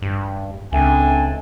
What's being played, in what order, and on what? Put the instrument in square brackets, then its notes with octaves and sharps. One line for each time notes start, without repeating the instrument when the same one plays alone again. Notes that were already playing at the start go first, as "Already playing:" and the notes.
[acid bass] G2
[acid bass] C#2 [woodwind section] A3 C4 D4 [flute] G#5